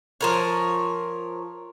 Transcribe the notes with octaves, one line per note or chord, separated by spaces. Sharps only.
F3 A#4 C#5